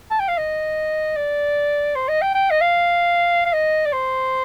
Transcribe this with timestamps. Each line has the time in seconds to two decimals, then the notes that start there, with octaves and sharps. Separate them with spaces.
0.11 A5
0.20 G5
0.28 F5
0.37 D#5
1.16 D5
1.95 C5
2.08 D#5
2.21 G5
2.35 G5
2.50 D#5
2.61 F5
3.46 F5
3.53 D#5
3.86 D5
3.92 C5